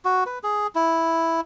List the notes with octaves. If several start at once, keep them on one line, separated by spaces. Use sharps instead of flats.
F#4
B4
G#4
E4